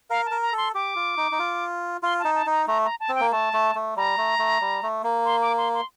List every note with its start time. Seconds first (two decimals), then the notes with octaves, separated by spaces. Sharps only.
0.10 A#4 F5
0.26 A#4 A5
0.42 A#5
0.53 A4 C6
0.74 G4 D6
0.96 F4
1.17 D#4
1.32 D#4
1.39 F4
2.03 F4 C6
2.19 D#4 A5
2.35 A5
2.46 D#4 A#5
2.67 A3 A#5
2.84 A#5
3.00 A5
3.09 C4
3.15 A#3 G5
3.31 A3 A5
3.53 A3
3.75 A3
3.96 G3 A#5
4.18 A3
4.39 A3
4.61 G3
4.83 A3
5.04 A#3
5.25 C6
5.41 D6
5.57 C6
5.74 C6